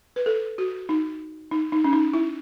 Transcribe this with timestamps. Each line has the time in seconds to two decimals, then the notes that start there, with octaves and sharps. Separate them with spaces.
0.16 B4
0.26 A4
0.58 F#4
0.89 D#4
1.51 D#4
1.72 D#4
1.84 C#4
1.93 D#4
2.13 E4